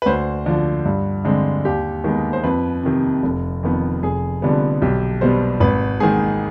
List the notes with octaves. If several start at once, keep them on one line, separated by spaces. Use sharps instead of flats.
B4
D2 C5
D3 F3
G2
D3 G#3 C4
D#2 G4
D#3 G#3 B3
C5
F2 B4
C3 D#3
F1
F2 D#3 B3
F1 G#4
F2 D3 G3 B3
B1 G4
B2 G3 B3 C5
G#1 B4
G#2 D#3 G#4